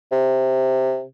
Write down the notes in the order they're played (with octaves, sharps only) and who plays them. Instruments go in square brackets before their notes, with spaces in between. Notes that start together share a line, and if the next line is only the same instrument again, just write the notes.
[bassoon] C3